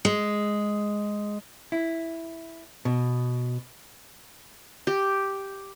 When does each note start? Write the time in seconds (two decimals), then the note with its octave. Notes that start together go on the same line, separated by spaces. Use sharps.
0.05 G#3
1.72 E4
2.85 B2
4.87 G4